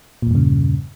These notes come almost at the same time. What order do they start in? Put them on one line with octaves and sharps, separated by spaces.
A#2 E2 G2 C#3